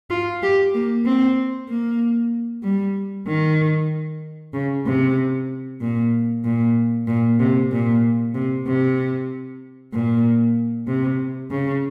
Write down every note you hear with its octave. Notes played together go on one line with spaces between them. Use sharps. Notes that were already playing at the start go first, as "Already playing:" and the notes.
F4
G4
A#3
C4
A#3
G3
D#3
C#3
C3
A#2
A#2
A#2
C3
A#2
C3
C3
A#2
C3
C#3